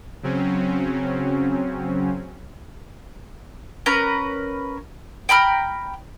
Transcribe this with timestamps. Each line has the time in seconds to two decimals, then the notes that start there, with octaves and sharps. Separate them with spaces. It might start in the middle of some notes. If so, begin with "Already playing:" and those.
0.23 C#3 F#3 C4 C#4
3.86 C#4 A#4 B4 A#5
5.29 G5 A#5 B5 F6